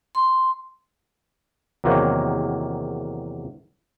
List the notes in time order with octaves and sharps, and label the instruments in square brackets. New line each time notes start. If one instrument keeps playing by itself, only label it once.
[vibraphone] C6
[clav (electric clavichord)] E2 C3 D#3 F#3 A#3